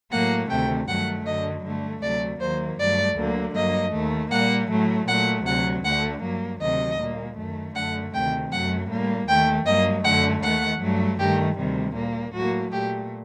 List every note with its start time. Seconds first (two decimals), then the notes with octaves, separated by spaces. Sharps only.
0.11 A2 F#3 A#3 F#5
0.50 D2 C3 D#3 A3 G5
0.88 G2 D#3 F#3 A3 F#5
1.26 F#2 D3 F#3 D#5
1.64 G2 D3 A3
2.02 D2 C3 F#3 A3 D5
2.41 D#2 D#3 F#3 A#3 C5
2.79 G2 F#3 A3 D5
3.17 D2 D3 F#3 A#3
3.55 G2 F#3 A#3 D#5
3.93 D#2 D#3 A3
4.31 A#2 G3 A#3 F#5
4.70 A2 F#3 A3
5.08 A#2 F#3 A3 F#5
5.46 D2 C3 F#3 F#5
5.84 D2 D3 A3 F#5
6.23 G2 F#3 A#3
6.61 D2 C3 D#3 F#3 D#5
6.99 A#2 G3 A#3
7.37 F#2 D#3 A3
7.75 F#2 D3 A3 F#5
8.13 D2 C3 D#3 A3 G5
8.52 F#2 F#3 A3 F#5
8.89 A2 G3 A#3
9.28 D#2 D#3 A3 G5
9.66 G2 F#3 A#3 D#5
10.04 F#2 D3 A3 F#5
10.42 D#2 D#3 A3 F#5
10.81 G2 F#3 A3
11.19 G2 D#3 A3 G4
11.57 D2 C3 D#3 G3
11.95 A#2 G3 A#3
12.33 A2 F#3 A#3 F#4
12.71 A#2 A3 G4